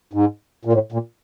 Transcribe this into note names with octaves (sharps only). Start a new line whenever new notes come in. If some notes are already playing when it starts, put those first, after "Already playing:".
G#2
A#2
A2
A#2